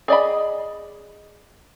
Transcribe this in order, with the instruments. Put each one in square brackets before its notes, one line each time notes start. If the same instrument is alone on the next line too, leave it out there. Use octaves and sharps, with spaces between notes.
[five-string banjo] G#4 D5 D#5 B5